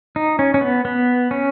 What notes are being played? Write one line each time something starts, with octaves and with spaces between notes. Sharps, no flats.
D#4
C#4
C#4
B3
B3
C#4